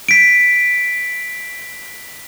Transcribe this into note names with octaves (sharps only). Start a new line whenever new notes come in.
B6 D7